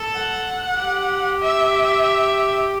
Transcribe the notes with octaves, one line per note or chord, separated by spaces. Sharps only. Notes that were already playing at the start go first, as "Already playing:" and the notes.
Already playing: A4
F#5
G4
E5